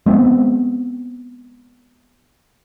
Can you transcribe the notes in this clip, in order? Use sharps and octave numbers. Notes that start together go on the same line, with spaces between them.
G#3 B3 C4